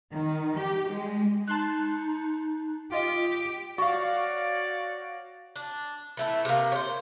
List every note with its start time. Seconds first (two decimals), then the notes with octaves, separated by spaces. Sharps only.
0.11 D#3
0.56 G4
0.90 G#3
1.48 D#4 A5 C6 F#6
2.92 F4 G4 D#5
3.78 F#4 C#5 D5 F5 C#6
5.56 D4
6.17 E3 A3 E4
6.45 C3 A#3
6.72 C5 C#5